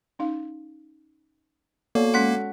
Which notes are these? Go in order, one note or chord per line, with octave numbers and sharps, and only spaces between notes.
C#4 D#4 F5
A#3 B3 F#4 A4 C#5 D5
G#3 C#4 F#5 C6 F#6 B6